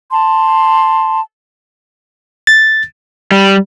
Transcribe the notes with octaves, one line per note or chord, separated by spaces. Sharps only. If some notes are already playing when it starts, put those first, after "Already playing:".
A5 C6
A6
G3